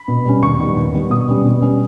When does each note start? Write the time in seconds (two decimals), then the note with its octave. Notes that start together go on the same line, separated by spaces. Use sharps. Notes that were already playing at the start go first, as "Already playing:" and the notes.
Already playing: B5
0.08 B2
0.25 G3 C#4
0.43 D#2 C#6
0.59 D#3 G3 B3
0.76 D#2
0.94 D#3 G3 B3
1.10 B2 D#6
1.28 G3 C#4
1.44 B2
1.62 G3 C#4